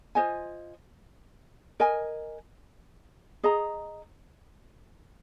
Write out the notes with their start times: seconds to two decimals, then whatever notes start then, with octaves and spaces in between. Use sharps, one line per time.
0.15 F4 C5 D#5 G#5
1.80 A#4 D#5 G#5
3.43 G#4 D#5 A#5